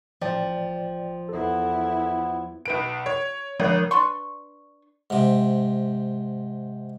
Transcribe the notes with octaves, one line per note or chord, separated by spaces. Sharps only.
A1 F3 D5 G5
E2 B3 E4 A4
B1 B4 D7
C#5
G1 F3 A#4
D4 B4 C6 C#6
G#2 C3